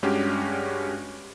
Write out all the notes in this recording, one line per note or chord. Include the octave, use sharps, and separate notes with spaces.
G2 G#3 C#4 D4 F#4 G4